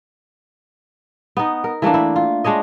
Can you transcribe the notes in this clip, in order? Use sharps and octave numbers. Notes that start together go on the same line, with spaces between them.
B3 D#4
A#4
E3 A3 A#3 D4
E4
F4
G#3 D4 C#5 D#5